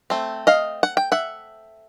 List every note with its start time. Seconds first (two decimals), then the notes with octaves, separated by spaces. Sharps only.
0.10 A3 C4
0.47 D#5 F5
0.83 F#5
0.97 G5
1.12 E5 F#5